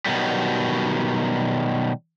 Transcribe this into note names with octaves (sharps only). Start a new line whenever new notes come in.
B2 D#3 F#3 G3